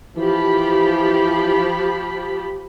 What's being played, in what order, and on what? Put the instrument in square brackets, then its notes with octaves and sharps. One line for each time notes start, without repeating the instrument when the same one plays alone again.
[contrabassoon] E3 [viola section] F3 G4 B5